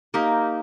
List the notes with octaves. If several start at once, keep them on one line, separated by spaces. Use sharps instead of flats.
A#3 D#4 G4